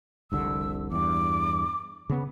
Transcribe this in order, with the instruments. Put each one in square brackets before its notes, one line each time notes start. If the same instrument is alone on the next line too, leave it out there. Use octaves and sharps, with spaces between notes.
[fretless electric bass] F1 C2 D3 [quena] E6
[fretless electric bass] E2 G2 [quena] D6
[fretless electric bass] C#3 B3